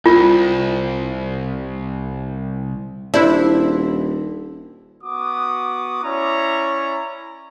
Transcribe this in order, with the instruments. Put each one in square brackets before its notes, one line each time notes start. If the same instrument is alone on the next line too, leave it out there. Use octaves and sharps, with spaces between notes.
[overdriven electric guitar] C2 [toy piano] F4
[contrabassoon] D#1 [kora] D4 C5 E5 [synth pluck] E4
[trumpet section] B3 F#4 D6 D#6
C#4 E4 C#5 D5 A#5